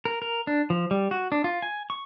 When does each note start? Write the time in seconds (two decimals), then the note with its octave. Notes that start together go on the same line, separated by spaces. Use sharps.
0.05 A#4
0.22 A#4
0.47 D4
0.70 F3
0.91 G3
1.11 F#4
1.32 D4
1.44 F4
1.62 G#5
1.90 C#6